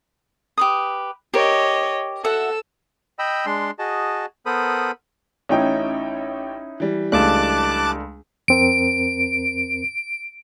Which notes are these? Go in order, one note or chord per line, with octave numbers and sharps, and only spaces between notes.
G4 B4 D#6
G4 A#4 C#5 D#5
F#4 A4 E5 F#5 E6
D#5 G5 B5 E6
G#3 D4 C6
F#4 G#4 D#5 A5
B3 A4 A#4 C5 B5 D#6
A1 C#4 D#4 E4 C#5 G5
E3 G3
C#2 A3 D4 A5 D6 F#6
F2 C4 A#4 D7